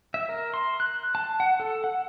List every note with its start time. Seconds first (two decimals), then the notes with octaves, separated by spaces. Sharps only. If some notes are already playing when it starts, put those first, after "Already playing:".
0.14 E5
0.29 A#4
0.54 C6
0.80 F#6
1.15 A5
1.40 F#5
1.60 A4
1.84 F#5